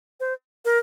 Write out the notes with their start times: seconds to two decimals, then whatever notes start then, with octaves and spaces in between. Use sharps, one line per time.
0.20 C5
0.65 A#4